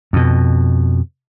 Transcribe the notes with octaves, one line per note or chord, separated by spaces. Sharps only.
F2 B2